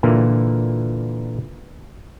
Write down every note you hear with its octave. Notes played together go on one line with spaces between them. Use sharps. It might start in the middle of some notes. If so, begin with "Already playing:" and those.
A#2 D3 E3 A#3